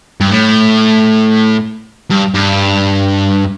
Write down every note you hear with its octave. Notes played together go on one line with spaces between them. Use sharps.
G2
A2
G2
G2